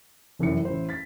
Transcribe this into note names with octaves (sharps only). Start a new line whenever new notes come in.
F1 F#2 E3 C#7
A1 E4 C5
A6 B6